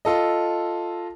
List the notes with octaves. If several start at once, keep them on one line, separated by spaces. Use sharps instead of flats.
F4 A4 D#5